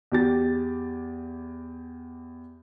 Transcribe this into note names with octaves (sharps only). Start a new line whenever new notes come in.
E2 G4 A6